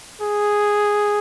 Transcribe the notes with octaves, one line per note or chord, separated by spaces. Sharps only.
G#4